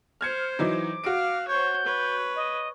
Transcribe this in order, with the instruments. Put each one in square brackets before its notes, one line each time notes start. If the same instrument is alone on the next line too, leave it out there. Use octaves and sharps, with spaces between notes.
[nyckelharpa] C5 [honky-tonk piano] F6 G#6 C#7
[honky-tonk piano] E3 F#3 D#4 [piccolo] D6
[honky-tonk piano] F#4 D7 [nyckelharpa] F5
[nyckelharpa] C5 C#5 [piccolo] G6
[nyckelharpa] B4 C#5
[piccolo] D#5